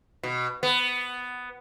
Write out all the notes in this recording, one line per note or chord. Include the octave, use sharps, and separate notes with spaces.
B2
B3